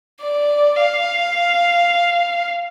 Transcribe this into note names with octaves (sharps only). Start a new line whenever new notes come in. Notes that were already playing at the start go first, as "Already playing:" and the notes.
D5
F5